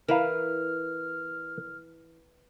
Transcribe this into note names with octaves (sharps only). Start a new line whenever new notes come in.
E3 A#4 B4 F5 F6